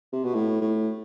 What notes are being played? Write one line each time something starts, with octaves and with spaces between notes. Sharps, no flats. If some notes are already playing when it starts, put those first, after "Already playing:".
C3
B2
A2
A2